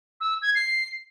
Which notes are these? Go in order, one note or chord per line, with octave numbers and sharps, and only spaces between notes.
E6
G#6
C7